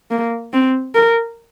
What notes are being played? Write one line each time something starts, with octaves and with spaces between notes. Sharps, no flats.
A#3
C4
A#4